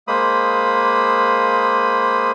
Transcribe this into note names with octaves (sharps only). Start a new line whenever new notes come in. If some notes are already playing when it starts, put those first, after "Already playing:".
G#3 A#3 C5 B5 D#6